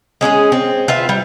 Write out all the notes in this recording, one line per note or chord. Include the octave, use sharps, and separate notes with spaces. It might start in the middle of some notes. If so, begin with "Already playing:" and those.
G#3 C#4 G4 G#4
C4
F4 B4 E5
G3